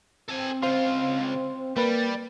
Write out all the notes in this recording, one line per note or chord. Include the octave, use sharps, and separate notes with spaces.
C4 A4 G#5
C#2 F4 C5 F5 C6
G3 A#3 B4 A6